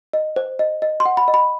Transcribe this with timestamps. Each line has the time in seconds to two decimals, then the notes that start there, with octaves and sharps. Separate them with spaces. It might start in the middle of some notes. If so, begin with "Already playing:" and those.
0.13 D#5
0.36 C5
0.59 D#5
0.82 D#5
1.00 C6
1.06 F#5
1.17 B5
1.28 D#5
1.34 B5